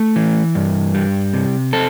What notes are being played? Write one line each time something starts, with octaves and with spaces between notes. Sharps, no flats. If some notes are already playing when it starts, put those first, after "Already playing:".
Already playing: A3
E3
G2
G3
C3
C4 A4